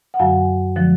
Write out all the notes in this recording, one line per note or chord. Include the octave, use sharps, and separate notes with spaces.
F#5
F#2 D3 F#3 F5 G#5
D3 F3 G#3